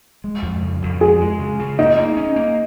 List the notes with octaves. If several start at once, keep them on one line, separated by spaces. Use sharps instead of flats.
G#3
F2
C#3
F2
G#3 G#4
G#3
C#3
C#3
A#3 D#4
A#3
C#4
A#3